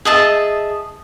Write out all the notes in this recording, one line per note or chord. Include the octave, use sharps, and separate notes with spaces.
G#4 D#5 E5 A5